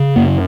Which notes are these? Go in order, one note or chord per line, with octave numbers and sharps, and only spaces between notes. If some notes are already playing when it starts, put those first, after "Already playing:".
Already playing: C#3
F#2 A#3